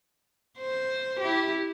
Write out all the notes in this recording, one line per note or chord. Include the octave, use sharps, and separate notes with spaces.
C5
E4 G4